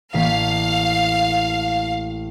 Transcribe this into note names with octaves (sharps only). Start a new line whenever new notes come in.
A1 A#3 F5 B6